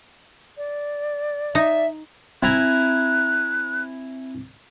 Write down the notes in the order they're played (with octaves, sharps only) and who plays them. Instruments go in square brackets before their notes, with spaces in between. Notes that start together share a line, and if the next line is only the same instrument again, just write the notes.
[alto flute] D5
[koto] D#4 [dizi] E5
[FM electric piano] C4 [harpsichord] E4 G#5 A#5 [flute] F#6